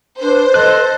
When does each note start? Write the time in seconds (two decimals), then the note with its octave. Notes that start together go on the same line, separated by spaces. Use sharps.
0.20 D4 B4 C5
0.54 A4 D#5 A5 F#6